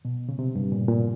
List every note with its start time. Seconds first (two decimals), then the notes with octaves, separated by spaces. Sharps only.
0.05 B2
0.29 C#3
0.39 C3
0.55 G2
0.72 A#2
0.88 A#2